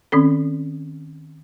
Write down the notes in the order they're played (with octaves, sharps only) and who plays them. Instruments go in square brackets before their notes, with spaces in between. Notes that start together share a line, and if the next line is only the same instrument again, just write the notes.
[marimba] D#3 C4 C#4 A4